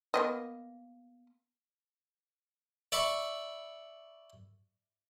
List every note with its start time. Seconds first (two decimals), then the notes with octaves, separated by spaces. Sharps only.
0.14 A#3 B3 D#5
2.92 D5 E5 B5 C#6